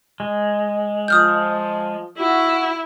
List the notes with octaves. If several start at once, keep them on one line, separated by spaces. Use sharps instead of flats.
G#3
F3 D#6 F6 G6
E4 F#4